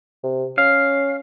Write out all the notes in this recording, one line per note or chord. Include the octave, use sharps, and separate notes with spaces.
C3
C#4 F5